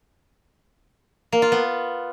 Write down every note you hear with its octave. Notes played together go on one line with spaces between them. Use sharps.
A#3
F4
B3